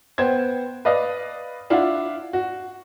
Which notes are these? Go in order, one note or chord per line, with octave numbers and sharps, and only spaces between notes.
B3 C5 G5 G#6
B4 D5 D#5 F5
D4 E4 F4 F5 F#5
F#4